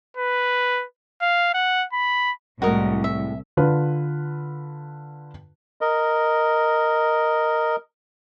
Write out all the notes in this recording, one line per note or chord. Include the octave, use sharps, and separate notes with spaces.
B4
F5
F#5
B5
C2 A2 G#3 F#4 A#4 D#5
E5
D3 F4 B4
A#4 D#5